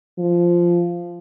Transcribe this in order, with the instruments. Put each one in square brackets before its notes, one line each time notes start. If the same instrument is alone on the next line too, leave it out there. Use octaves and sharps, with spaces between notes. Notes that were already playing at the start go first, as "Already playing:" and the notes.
[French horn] F3